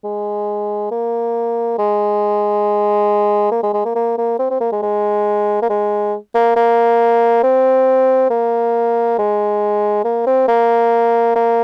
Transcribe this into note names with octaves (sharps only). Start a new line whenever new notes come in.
G#3
A#3
G#3
A#3
G#3
G#3
A#3
A#3
A#3
C4
C4
A#3
G#3
G#3
A#3
G#3
A#3
A#3
C4
A#3
G#3
A#3
C4
A#3
A#3